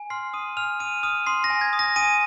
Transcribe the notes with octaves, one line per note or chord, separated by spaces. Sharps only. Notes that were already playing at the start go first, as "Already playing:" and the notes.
Already playing: G#5
C6 F6 C7
C6 D#6 D#7
G#5 F6 F7
G#5 D#6 D#7
D#6 F6 D#7
C6 D#6 C7
A#6
G#5
G#6
D#6
A#6
G#5 D#6 D#7